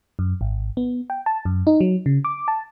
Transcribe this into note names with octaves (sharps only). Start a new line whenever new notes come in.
F#2
G#1
B3
G5
A5
F#2
D#4
F#3
C#3
D6
A5